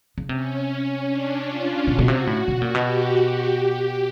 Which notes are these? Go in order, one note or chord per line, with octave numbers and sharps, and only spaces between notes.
C#3
C3 C#4
D4
F4
B2 F#4
B2
C3
A2
B2
A#2
G4
B2
G4